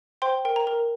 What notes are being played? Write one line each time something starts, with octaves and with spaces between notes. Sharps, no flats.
C5 G5 C6
A#4 G5
A#5
A#4